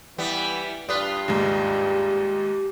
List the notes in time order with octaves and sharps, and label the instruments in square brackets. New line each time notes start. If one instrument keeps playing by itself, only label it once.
[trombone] E3 [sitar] G3 B3
[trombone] G2 [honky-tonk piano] D4 [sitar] F4 B4 [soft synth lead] D#6
[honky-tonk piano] D#2 G#2 [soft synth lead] G4